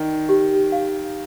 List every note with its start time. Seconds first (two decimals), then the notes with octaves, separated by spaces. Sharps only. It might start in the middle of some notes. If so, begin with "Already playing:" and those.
Already playing: D#3 D5
0.29 G4
0.72 F5